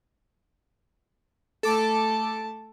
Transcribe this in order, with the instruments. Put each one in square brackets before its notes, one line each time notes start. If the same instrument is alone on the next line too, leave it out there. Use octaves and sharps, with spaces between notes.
[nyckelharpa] A3 A5 [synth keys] A4 D6